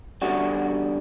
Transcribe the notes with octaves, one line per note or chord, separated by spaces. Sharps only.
E2 D3 G3 F#4